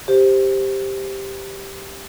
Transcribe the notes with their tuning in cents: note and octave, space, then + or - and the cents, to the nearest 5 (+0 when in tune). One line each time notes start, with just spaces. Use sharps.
G4 +0 C5 +0